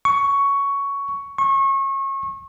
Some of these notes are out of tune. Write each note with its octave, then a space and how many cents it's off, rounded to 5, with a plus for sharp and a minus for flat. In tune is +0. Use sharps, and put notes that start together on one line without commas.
C#6 +10
C#6 -30